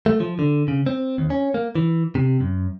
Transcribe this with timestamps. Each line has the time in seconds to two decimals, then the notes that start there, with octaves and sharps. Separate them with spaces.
0.06 A3
0.20 F3
0.39 D3
0.68 C#3
0.86 C4
1.18 D#2
1.30 C#4
1.54 A#3
1.75 E3
2.15 C3
2.40 F#2